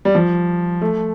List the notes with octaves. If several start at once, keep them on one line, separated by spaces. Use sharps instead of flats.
G3
F3
A3